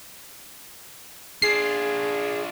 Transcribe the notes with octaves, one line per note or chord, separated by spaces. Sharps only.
D4 F4 G#4 C7